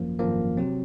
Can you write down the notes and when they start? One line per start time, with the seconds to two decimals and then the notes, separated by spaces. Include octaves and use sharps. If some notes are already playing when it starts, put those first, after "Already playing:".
Already playing: G#1 F#2 F3 A#3
0.19 G#1 F#2 F3 A#3
0.57 C3 F#3 C4